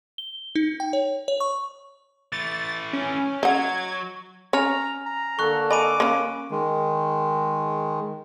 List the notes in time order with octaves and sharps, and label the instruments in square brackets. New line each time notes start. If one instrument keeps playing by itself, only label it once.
[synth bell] G7
D#4
G5
C#5
C#5
C#6
[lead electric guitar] E3 A3 [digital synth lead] A6
[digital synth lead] C#4
[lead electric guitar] F#3 [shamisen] D#5 F#5 [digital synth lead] G#6
[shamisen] C#4 C#5 [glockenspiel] G#5 F6 F7 [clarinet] A#5
[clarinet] A#5
[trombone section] D3 A#3 A4 [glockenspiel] C#6 F#6
[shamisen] D#5 [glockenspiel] G#5 B5 D#7 [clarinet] D6
[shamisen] A#3 C#4
[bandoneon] D#3 G#3